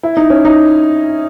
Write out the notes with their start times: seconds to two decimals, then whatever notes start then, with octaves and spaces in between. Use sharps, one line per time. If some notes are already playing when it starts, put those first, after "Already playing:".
0.03 E4
0.17 D#4
0.30 C#4
0.45 D#4